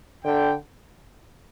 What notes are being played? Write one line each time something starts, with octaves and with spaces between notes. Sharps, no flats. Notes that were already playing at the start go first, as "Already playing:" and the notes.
D3 G5